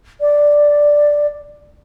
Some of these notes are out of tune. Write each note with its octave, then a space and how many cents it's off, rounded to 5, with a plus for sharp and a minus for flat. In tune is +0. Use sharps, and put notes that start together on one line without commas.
D5 +0